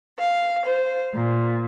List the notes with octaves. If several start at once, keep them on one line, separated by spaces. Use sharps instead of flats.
F5
C5
A#2